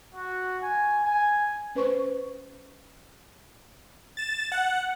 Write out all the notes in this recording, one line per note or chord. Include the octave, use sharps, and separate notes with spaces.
F#4
G#5
G#5
C#4 B4 C5 C#6
A6 E7
F#5